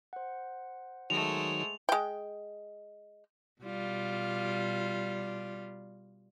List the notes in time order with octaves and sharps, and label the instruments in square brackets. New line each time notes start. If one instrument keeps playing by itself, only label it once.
[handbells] C5 F#5
[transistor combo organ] D#3 F#3 [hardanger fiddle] G#3 A3 [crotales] F7
[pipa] G#3 G5
[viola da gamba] B2 G3 F4